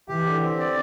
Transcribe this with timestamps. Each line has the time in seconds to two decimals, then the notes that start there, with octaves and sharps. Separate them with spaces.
0.08 E3 G4
0.26 D3
0.42 C4
0.59 D5